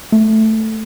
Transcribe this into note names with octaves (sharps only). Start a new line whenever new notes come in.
A3